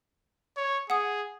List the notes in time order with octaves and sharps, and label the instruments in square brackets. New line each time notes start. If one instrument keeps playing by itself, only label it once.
[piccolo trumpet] C#5
[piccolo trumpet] G#4 [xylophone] F#5 D#6